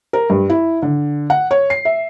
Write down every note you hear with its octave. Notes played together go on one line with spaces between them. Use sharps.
A#4
G2
E4
D3
F#5
C#5
C7
E5